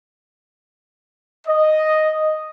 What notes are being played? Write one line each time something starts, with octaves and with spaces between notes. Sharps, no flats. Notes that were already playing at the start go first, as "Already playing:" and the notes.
D#5